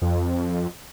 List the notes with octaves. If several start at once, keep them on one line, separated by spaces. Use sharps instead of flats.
F2